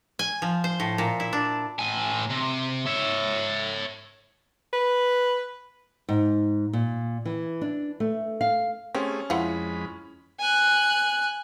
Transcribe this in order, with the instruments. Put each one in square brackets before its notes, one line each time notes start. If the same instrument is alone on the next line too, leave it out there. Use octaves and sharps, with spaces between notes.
[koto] G#5
F3
C5
A2
A#2
E4
D4
[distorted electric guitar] A2 G#5
C3
C#5 E5
[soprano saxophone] B4
[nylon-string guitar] G#2
A#2
E3
D4
A3
F5
[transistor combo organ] A3 G#4 [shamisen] C4 G4 [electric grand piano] C#4
[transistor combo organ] F2 G#3 B5 [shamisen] E4 F4 F#5
[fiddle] G#5 F#6